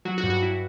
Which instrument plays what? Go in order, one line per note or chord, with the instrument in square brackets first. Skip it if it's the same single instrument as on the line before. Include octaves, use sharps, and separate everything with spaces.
[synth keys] F#3 F#4
F#4
G2
F#4
E4